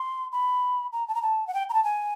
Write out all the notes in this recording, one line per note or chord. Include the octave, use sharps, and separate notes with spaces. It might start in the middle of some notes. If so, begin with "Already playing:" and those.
Already playing: C6
B5
A#5
A5
A#5
A5
F#5
G5
A#5
A5
G#5